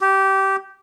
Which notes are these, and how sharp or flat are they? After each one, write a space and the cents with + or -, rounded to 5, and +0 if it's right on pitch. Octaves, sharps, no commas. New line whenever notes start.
G4 -20